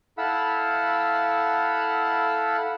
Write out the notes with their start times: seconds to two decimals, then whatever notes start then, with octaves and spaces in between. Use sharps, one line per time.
0.18 E4 A4 F5 F#5 B5 E6